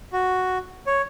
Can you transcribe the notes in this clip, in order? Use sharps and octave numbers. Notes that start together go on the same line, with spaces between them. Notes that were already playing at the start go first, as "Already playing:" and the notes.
F#4
C#5